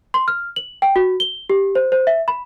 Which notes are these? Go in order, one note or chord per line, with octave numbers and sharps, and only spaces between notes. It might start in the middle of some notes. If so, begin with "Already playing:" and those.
C6
F6
F#7
G5
F#4
G7
G4
C5
C5
E5
B5